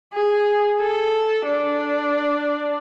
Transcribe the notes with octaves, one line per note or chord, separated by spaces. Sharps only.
G#4
A4
D4